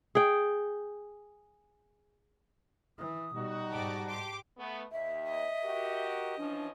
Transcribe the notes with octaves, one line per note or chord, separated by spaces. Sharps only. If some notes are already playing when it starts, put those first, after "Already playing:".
G#4 G5
E3 D#6
B2 G3 D#4 F#4
G#2 G4 D5 A5 D6
G4 C6 D6
A3 B3
D#2 E5
D#5
F#4 G4 A#4
E3 F3 C#4 D4